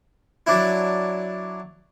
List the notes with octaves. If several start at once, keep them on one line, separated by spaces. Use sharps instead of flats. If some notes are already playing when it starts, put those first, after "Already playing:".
F#3 D4 E4